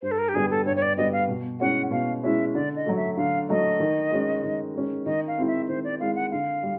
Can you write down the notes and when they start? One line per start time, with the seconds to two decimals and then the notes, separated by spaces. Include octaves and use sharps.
0.02 G2 C5
0.11 A4
0.18 A#4
0.29 G4
0.34 D3 G3 B3 G#4
0.51 A4
0.66 G2 C#5
0.76 C#5
0.82 D5
0.97 D3 G3 B3 D#5
1.12 F5
1.28 B2
1.60 G#3 C#4 E4 F#5
1.91 B2 F5
2.23 G#3 C#4 E4 E5
2.54 D3 D5
2.76 D#5
2.86 F#3 A3
2.96 E5
3.17 D3 F5
3.49 F#3 A3 D#5
3.80 D#3
4.11 G#3 C#4
4.43 D#3
4.75 G#3 C#4
5.06 D#3 D#5
5.27 F5
5.38 G#3 C4 E4
5.47 E5
5.69 D#3 C5
5.84 D5
6.00 G#3 C4 E4 F5
6.15 F#5
6.31 D3 F5
6.63 G3